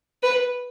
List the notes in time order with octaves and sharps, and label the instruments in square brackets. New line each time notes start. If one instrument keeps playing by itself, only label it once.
[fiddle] B4